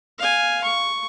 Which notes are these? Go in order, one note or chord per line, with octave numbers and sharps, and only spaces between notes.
F5 G#5
C#6